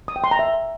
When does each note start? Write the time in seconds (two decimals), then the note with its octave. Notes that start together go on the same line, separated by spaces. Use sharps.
0.08 D#6
0.16 G5
0.24 C6
0.31 A#5
0.39 E5